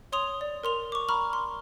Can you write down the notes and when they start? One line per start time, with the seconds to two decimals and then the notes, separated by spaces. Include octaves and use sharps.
0.12 C#5 C6 D#6 F7
0.41 D5
0.63 A#4 C6 F7
0.92 C#6 D6
1.09 A#5 B5 C#6 F6
1.33 C6